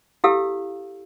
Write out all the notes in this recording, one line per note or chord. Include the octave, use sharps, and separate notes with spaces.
E4 G4 A4 F5 E6